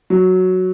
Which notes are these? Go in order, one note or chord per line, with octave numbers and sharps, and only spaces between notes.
F#3